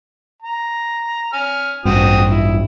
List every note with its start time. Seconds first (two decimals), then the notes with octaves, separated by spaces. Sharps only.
0.42 A#5
1.33 G#5 F6
1.85 A1 G2 C4 F#4 D#6
2.29 E4